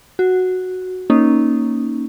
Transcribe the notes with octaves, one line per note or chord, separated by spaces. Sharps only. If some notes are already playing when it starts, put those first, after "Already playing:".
F#4
A#3 C#4 D#4